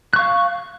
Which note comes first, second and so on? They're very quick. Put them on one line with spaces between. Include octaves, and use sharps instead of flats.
F#6 C#6 F5